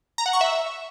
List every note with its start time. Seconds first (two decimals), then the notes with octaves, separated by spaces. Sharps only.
0.18 A#5
0.26 F#5
0.33 C#6
0.41 E5